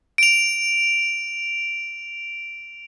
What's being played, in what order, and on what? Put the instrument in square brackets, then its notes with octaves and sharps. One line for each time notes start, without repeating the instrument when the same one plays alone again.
[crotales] D7 F7